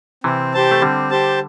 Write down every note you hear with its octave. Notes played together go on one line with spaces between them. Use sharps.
C3 E3 C4
G4 C5 A5
A3
D3 G3 C4
G4 C5 A5